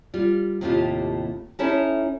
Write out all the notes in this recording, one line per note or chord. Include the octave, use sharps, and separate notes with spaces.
G3 F4
D#2 A2 C3 A3 F4 G4
C#4 D#4 E4 A4 C#5 E5